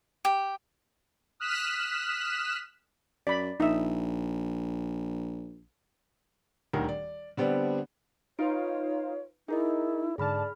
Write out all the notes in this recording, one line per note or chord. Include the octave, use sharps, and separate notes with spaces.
G4
D#6 F6 F#6 B6 E7
F#2 D5 B5
A#1 D#4 E5
D#1 D2 D#3 A#4
D5
D3 G3 B3 C4 D4
D#4 F4 B4 C#5 F5 D7
D#4 E4 G#4 A#4 D#5
G#2 D3 G#4 D5 A5 B5 F6